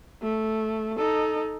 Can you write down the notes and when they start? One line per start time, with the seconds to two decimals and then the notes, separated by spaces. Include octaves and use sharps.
0.22 A3
0.98 D#4 A4